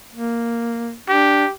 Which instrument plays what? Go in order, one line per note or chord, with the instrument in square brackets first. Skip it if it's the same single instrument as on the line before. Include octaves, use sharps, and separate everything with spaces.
[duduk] A#3
[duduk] D4 [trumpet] G4